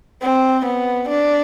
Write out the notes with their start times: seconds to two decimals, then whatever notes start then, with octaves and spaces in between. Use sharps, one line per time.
0.22 C4
0.65 B3
1.09 D4